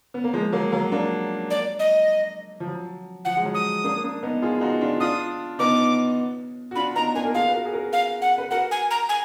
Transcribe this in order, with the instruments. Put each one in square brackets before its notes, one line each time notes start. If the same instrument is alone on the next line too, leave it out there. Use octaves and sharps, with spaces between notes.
[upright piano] B3
A#3
F3 G#3
F#3 A#3
F#3 A#3
A#3 D4
[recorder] D5
D#5
[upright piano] F3
F#3
[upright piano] F3 [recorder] F#5
[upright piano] G#3
F#3
[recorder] D#6
[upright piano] A#3 D4
A#3 D4
B3 D#4
F4 G#4
F4
D#4 F#4
D4 F4
[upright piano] D4 F4 [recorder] D#6
[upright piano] B3 D#4 [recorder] D6
[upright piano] F#4
[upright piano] D4 F4 [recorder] B5
[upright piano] B3 D#4 [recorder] A#5
[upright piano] A#3 D4 [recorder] G#5
[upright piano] A#4
[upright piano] F4 G#4 [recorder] F5
[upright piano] B4
F#4 A#4
G#4
F#4 A#4
[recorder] F5
F#5
[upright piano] B4
[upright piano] F#4 A#4 [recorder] F#5
[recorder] G#5
A#5
G#5